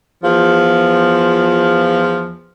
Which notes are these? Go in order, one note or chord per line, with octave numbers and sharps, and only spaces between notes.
E2 F3